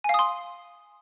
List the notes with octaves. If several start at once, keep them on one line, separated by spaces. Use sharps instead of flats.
F5 G#5 C6 D#6